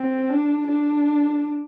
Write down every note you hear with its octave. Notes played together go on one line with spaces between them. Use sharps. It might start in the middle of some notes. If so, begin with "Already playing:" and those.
Already playing: C4
D4
D4